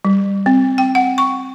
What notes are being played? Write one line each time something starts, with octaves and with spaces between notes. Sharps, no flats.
G3
C4
G5
F#5
C#6